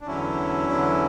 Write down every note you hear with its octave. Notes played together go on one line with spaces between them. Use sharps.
D4
E2 D3 F#3 C#4 E4
E2 D3 F#3